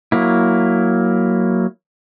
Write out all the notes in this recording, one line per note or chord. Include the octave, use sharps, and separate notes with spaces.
F#3 A#3 E4